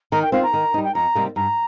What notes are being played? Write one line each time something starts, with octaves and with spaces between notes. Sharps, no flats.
D#3 A#5
G5
C4 F4 F5
A#5
D#3
G3 D#4
G5
F2 A#5
C3 G3 A#3 D#4
G2 A#5